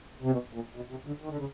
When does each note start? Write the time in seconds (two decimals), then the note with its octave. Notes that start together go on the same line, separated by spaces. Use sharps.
0.22 C3
0.31 B2
0.53 A#2
0.76 B2
0.90 C3
1.07 D3
1.21 D#3
1.29 D3
1.37 C#3